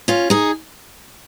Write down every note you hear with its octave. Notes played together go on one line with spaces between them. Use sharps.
C#4 F4
D#4 G#4